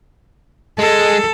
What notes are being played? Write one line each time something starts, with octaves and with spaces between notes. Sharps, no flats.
G#3 A4